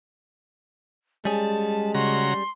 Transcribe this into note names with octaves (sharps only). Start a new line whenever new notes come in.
G3 G#3 C#4 G#4 A5
C#3 F#4 A#5 C6